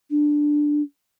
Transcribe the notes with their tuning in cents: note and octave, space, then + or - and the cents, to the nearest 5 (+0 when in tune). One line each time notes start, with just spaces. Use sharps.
D4 +5